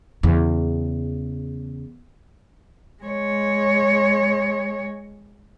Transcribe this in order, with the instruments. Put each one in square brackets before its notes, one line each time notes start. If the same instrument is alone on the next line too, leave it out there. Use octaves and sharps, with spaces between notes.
[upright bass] E2 C#3
[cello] G#3 C#5